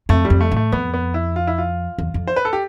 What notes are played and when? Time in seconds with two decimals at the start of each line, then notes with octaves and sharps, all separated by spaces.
0.09 F2 A3
0.25 G3
0.30 F2
0.41 A3
0.52 A2 A3
0.72 F2 B3
0.94 B3
1.14 E4
1.36 F4
1.47 E4
1.58 F4
1.98 E2
2.14 F2
2.28 C5
2.36 B4
2.45 A4
2.53 G4